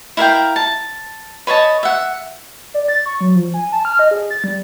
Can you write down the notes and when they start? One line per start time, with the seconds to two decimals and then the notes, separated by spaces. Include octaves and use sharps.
0.17 E4 A#4 F5 G5
0.56 A5
1.47 B4 C#5 D#5 A5
1.83 E5 F#5
2.74 D5
2.88 A6
3.06 C#6
3.21 F#3
3.35 F3
3.54 G#5
3.72 A5
3.85 F6
3.99 D#5
4.11 G#4
4.30 A6
4.44 G3